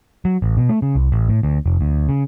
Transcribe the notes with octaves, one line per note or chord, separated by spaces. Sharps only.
F#3
A1
B2
A3
C#3
C2
A1
A2
D2
F1
D2
C#3